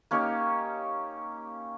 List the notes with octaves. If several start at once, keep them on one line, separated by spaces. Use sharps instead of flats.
A#3 C#4 D#4 G4